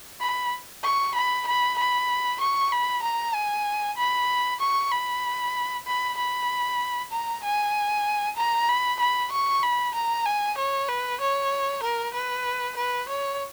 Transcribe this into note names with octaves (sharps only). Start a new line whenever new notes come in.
B5
C#6
B5
B5
B5
C#6
B5
A#5
G#5
B5
C#6
B5
B5
B5
A#5
G#5
A#5
B5
B5
C#6
B5
A#5
G#5
C#5
B4
C#5
A#4
B4
B4
C#5